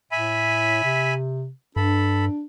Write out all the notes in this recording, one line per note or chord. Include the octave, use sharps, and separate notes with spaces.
A2 E5 G#5 B5
C3
G2 D4 A4 B5